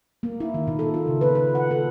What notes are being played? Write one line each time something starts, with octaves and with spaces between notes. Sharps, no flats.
A#3
E4
D#3
A#2
A4
F4
C#3
B4
B4
F#5
A4